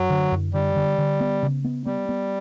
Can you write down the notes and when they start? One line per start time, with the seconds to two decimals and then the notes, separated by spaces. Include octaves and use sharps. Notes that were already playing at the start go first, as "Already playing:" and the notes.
Already playing: F#2 F#3
0.10 D3
0.32 F#2
0.54 D3 G3
0.76 D3
0.98 D3
1.20 B3
1.43 C#3
1.64 B3
1.86 G3 B3
2.09 B3